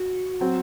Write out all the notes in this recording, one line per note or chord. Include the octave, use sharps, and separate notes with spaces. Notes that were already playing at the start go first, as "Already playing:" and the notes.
Already playing: F#4
F#3 C4